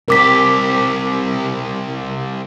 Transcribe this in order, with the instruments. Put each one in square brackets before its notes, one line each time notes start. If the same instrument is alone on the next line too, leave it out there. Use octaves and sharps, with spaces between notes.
[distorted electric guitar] C2 G4 [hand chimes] A#4 D6 B6